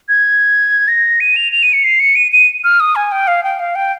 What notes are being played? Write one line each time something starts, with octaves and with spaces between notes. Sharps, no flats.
G#6
A#6
D#7
F7
F7
D#7
C#7
C7
C#7
D#7
D#7
F6
D#6
G#5
G5
F5
G5
F5
G5